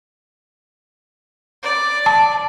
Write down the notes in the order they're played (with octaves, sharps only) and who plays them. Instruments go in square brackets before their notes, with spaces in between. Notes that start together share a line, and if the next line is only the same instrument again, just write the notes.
[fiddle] D5
[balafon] A5